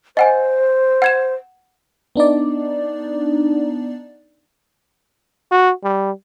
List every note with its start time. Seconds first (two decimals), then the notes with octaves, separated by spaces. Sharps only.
0.17 C5 D#5 F#5 G#5
1.02 F#5 G#6 E7
2.16 B3 D4 D#4 D5
5.52 F#4
5.84 G3